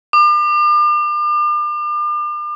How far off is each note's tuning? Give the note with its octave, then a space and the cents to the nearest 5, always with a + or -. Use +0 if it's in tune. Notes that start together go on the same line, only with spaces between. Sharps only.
D6 +40